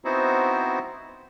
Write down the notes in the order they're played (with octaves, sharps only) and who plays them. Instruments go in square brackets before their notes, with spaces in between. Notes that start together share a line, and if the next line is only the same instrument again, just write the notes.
[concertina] B3 C4 D#4 E4 F#4 C5